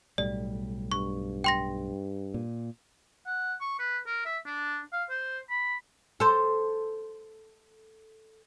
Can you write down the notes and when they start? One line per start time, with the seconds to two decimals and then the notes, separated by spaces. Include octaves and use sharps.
0.18 B1 A2 G3 D5
0.92 G2 C#6
1.44 G5 C6 A#6
2.34 A#2
3.26 F#5
3.61 C#6
3.79 B4
4.07 A#4
4.25 E5
4.46 D4
4.93 F5
5.10 C5
5.50 B5
6.20 A4 C5